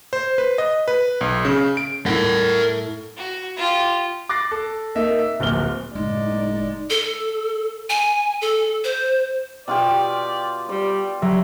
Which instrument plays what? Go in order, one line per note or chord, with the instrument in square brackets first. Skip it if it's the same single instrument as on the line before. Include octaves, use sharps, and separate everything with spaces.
[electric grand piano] C5
B4
D#5
B4
B1
C#3
D7
[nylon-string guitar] A2 E4 [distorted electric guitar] A#4 F#5
[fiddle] F#4
F4 G4
[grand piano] D6 F#6 A6 A#6 C7
A4
A#3 D#4 E5
E5
D1 A#1 A#2 F6 G7
[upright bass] F#1 A2 [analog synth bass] G#3 [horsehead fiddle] D#4 D5
[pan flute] A4
G#5
A4
C5
[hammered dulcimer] B2 F4 G4 [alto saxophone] D5
[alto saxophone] G3 [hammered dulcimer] D5
[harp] F#3 [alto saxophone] G3 [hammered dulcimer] E5